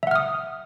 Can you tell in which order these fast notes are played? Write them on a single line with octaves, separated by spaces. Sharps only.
E5 F#5 F6 D#6